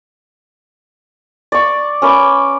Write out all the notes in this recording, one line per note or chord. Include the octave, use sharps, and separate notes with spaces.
D5 C#6
C#4 B4 B5 D6